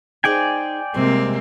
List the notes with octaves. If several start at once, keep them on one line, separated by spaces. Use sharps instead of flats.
D#4 G#4 C5 D5 G5 G#5
C3 G3 G#3 A#3 C4